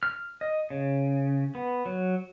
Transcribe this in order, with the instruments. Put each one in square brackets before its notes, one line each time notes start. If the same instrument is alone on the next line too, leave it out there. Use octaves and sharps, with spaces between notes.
[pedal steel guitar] F6
D#5
C#3
B3
F#3